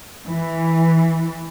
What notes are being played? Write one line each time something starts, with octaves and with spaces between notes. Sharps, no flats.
E3